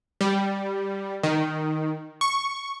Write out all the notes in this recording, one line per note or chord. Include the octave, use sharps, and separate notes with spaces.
G3
D#3
C#6